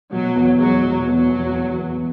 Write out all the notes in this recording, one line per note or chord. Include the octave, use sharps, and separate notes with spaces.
B2 F#3
E2
F#3 G#3
B2
E2 F#3
E2
E2
E2